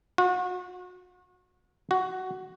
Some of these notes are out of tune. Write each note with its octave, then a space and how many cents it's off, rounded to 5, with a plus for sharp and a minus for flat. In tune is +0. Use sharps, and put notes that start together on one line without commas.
F#4 -35
F#4 +10